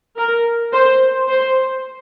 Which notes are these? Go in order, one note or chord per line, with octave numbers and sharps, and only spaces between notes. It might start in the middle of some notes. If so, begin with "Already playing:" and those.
A#4
C5
C5